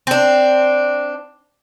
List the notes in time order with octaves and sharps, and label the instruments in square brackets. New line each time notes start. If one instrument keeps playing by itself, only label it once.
[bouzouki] C4 D4